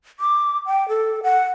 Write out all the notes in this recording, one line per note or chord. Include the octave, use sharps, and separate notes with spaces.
D6
G5
A4
F#5